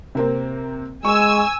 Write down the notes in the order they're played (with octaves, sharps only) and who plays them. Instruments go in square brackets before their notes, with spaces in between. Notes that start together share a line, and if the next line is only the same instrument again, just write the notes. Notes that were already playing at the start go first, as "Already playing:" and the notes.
[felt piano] C3 A#3 C4
[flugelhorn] G#3 [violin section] G#5 E6 [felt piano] C#6